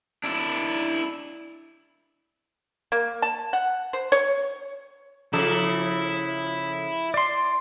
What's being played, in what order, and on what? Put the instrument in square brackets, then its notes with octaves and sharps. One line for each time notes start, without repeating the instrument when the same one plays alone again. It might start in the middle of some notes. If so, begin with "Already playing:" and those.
[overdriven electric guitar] D4 E4
[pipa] A#3
A5
F#5
C5
C#5
[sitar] C#3 F3 A4 [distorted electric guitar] E4
[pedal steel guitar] D5 C6